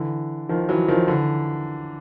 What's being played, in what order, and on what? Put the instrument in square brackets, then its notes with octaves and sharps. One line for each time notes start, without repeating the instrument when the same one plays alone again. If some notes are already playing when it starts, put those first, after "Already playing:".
Already playing: [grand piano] D3 E3
D#3 F3
E3 F#3
D#3 F3
D3 E3